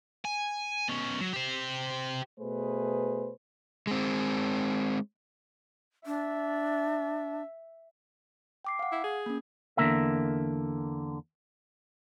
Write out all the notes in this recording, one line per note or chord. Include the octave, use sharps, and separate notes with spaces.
G#5
B2 C#4
F#3
G4 C5
B2 A3 G#4 B4 C5
G#3 C4
D4 E5
G5 D6 C7
F5 F#5
E4
G#4
A#3 C#4
E2 D3 E3 A#3 A#4 E5